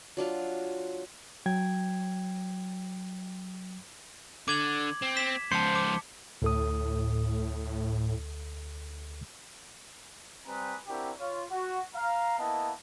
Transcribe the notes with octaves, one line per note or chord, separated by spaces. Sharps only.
F#3 D4 F4
F#3 G5 G#6
D3 D6 G#6 F#7
C4
B6 E7
C#2 F3 C5 A5 C#7
D6
D2 A2 A4 D#6
G3 C4 B4 G#5 A#5 D#6
C4 D4 E4 F#4 G4 A#4
F4 C#5
F#4
F5 A#5
A#3 B3 E4 D#5 A5